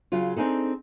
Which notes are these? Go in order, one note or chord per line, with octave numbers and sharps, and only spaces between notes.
C#3 F#3 F4
C4 D4 D#4 G#4 A4